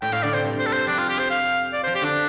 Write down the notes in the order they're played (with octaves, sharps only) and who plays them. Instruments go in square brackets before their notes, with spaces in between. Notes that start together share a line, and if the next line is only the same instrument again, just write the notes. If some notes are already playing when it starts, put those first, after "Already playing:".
[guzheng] A2 [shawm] G5
[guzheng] A2 [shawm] F5
[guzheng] D3 [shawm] D5
[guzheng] C3 [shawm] C5
[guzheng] G2
[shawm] C5
A4
C5
[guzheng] F2 [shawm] D4
[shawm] F4
G4
C5
F5
D5
C5
[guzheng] F3
[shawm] G4
[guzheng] D3 [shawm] D4